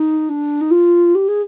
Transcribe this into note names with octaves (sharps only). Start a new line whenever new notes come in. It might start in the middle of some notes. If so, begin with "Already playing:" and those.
Already playing: D#4
D4
D#4
F4
G4
G#4